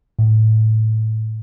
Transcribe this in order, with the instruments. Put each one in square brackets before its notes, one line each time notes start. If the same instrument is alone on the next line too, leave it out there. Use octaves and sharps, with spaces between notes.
[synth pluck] A2